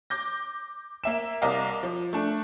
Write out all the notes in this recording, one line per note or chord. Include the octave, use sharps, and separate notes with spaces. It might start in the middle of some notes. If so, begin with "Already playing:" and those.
D6 G6 A#6
A#3 E5 E7
C2 A#4 D5 D#5 F5
F3
A3 D4